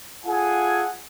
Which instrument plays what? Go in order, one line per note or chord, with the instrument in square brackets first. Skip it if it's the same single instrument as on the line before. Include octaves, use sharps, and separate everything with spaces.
[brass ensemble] F4 G#4 A4 F#5 G#5